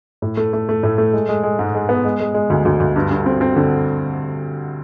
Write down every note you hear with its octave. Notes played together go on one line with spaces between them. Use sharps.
A2
A3
A3
A3
A2
A3
G#3
G#3
G#3
G#2
G#3
B3
G#3
G#3
G#3
D2
D2
D2
G2
G2
C4
C4
D3